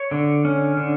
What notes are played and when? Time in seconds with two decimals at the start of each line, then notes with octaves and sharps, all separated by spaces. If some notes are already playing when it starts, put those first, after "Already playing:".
Already playing: C#5
0.11 D3
0.45 C#4
0.77 D3